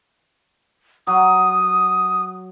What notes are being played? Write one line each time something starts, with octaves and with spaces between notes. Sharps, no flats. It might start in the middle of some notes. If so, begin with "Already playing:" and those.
F#3 D#6